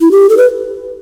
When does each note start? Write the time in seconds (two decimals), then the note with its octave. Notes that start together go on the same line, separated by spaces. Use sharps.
0.01 E4
0.11 G4
0.29 A4
0.37 B4